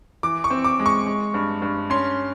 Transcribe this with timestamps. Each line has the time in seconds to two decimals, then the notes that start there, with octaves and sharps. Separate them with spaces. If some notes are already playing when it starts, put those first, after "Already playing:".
0.23 E3 D6
0.44 C#6
0.50 C4
0.64 D6
0.80 G#3
0.86 C#6
1.07 G#3
1.34 G2
1.62 G2
1.90 C#4 C6